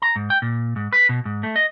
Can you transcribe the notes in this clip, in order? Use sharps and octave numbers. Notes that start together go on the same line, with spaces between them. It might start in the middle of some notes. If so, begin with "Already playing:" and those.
A#5
G#2
G5
A#2
G#2
B4
B2
G#2
A3
D#5